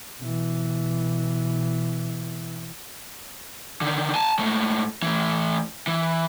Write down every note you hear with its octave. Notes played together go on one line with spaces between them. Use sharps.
B2 E3
D3 D#3
G#5 A5
G#2 A3
E3 A3
E3